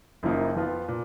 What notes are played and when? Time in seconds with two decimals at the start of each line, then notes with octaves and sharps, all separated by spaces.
0.23 F#1 F#2 F3 A#3 D#4
0.55 F2 F3 B3 F4
0.88 A#2